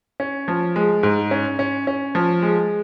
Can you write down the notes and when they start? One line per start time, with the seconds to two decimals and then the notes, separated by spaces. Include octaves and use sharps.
0.20 C#4
0.48 F3
0.76 G#3
1.03 G#2
1.31 C#4
1.59 C#4
1.87 C#4
2.15 F3
2.42 G#3